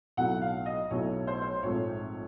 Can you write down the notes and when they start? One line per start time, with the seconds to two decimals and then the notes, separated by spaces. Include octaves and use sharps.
0.17 B1 A2 F#3 A3 F#5
0.42 F5
0.66 D#5
0.91 B1 A2 F#3 A3 C#5
1.27 C5
1.34 C#5
1.42 C5
1.63 A#1 G#2 F3 A3 C4 C#5